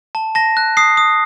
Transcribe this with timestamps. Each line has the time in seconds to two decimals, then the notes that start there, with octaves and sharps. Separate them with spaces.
0.15 A5
0.35 A5 A#6
0.57 F#6
0.77 D#6 C7
0.97 D#6